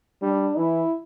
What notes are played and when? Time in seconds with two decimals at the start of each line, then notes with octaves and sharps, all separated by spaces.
0.22 G3 D4
0.57 E3 E4